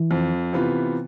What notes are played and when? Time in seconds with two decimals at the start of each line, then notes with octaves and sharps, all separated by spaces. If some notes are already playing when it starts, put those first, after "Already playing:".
Already playing: E3
0.11 F2
0.53 C3 E3 B3 F4